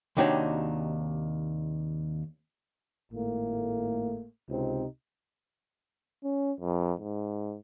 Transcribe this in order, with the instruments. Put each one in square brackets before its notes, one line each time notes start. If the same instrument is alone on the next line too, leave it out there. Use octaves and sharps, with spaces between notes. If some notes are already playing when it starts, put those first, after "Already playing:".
[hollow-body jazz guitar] D#2 C3 D4 D#4 F#4 C#5
[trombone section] G#1 A2 A3 A#3
C#2 C3 C4 D#4
[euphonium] C#4
F2
G#2